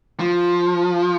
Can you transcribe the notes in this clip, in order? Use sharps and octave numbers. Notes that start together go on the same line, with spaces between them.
F3